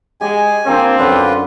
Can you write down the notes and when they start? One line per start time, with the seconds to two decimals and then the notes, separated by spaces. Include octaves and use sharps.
0.21 G#3 G4 D#5 G#5
0.66 A#3 C4 D4 D#4 F4
0.98 F#2 D3 F4 B4 D6